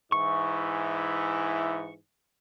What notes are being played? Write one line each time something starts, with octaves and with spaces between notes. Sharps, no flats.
G#2 E3 E4 C#6